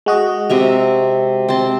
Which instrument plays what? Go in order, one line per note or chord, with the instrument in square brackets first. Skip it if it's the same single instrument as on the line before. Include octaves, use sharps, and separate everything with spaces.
[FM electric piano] G#3 F#4 D#5
[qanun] C3 E5 A#5
C4 A5 C6